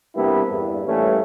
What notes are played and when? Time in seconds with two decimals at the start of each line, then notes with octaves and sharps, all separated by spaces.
0.16 C3 G3 A#3 B3 D4 E4
0.50 E2 G2
0.85 A2 E3 G3 A3 A#3 C#4